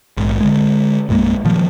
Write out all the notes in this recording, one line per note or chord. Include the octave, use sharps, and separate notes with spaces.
A#1 G#2
D3 G#3
A#1 F#2 G#3 A#3
A#2 D#3 F3 G3